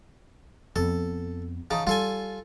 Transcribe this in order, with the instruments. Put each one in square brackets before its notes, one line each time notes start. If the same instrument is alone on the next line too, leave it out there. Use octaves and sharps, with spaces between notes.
[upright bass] F2 B3 [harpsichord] A4
[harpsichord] C#3 D#4 A5 [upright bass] E3
[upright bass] G3 [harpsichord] F4 A4 G#5